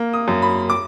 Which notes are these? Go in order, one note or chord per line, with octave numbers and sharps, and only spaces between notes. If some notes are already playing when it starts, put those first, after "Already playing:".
Already playing: A#3
D#6
F#2
B5
D6